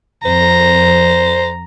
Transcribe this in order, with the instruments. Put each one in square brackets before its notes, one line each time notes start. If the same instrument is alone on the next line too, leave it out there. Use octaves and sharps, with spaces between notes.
[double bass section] F2 [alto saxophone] C5 [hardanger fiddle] A#5